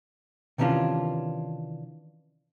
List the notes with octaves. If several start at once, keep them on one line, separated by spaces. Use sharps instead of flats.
C3 D#3 E3 C#4 D4 F4